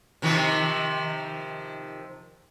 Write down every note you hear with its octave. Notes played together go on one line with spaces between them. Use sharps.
C3 D#3 F3